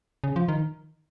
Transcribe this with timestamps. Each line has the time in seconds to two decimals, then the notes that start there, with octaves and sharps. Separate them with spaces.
0.24 C#3
0.36 F3
0.48 D#3